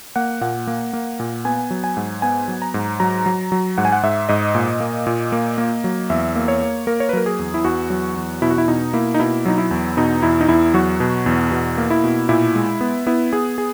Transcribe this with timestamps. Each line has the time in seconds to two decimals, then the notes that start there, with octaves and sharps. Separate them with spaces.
0.16 A#3 F#5
0.41 A#2 F#5
0.67 A#3
0.93 A#3
1.20 A#2
1.45 B3 G#5
1.70 F#3
1.84 G#5
1.97 G#2
2.22 B3 G#5
2.48 F#3
2.62 A#5
2.74 G#2
3.00 F#3 A#5
3.26 F#3
3.52 F#3
3.78 G#2 F#5
3.85 G#5
3.92 F#5
4.03 G#2 E5
4.29 G#2 D#5
4.55 A#2
4.80 A#3
5.07 A#2
5.32 A#3
5.58 A#3
5.84 F#3
6.10 E2 E5
6.36 A#3
6.48 C#5
6.61 A#3
6.87 A#3 A#4
7.00 C#5
7.09 B4
7.13 F#3 A#4
7.26 G#4
7.39 E2
7.54 E4
7.64 E2 F#4
7.90 F#3
8.16 E2
8.42 B2 E4
8.50 F#4
8.58 E4
8.68 B2 D#4
8.93 A#3 E4
9.14 D#4
9.19 B2 E4
9.45 F#3 D#4
9.58 E4
9.71 E2
9.97 B2 D#4
10.22 E2 E4
10.41 D#4
10.48 E2 E4
10.74 F#3 F#4
11.00 B2
11.26 E2
11.52 B2
11.78 A#3
11.90 E4
12.04 B2
12.29 A#2 E4
12.55 G#3
12.81 B3
13.07 B3 E4
13.33 B3 G#4
13.58 G#4